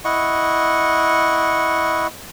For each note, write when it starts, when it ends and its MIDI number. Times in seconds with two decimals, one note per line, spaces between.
0.05 2.07 64
0.05 2.07 75
0.05 2.07 78
0.05 2.07 85